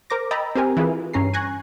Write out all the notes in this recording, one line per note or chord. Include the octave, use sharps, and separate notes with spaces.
A#4 C5 D6 A#6
D#5 G5 A#5 B5 E6 A6
C4 G4 A#4 G#5
E3 E4 F4 G#4 B4
G2 C#4 A#5 C7
G#5 C#6 F#6 G#6 A#6